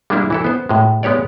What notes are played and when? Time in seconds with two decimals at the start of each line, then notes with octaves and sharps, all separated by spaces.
0.10 G3 G#3 A#3 D4 E4
0.30 E3 E4 A4
0.44 B3 C5
0.69 A2 G#3
1.03 G#3 B3 G4 C#5 D5